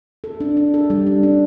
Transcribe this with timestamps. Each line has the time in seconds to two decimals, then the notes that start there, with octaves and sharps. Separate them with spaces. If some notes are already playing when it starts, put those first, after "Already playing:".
0.24 A4
0.40 D4
0.57 D4
0.74 A4
0.90 G3
1.07 D4
1.23 D4